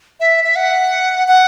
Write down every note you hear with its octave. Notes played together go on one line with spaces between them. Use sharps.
E5
E5
F#5
F#5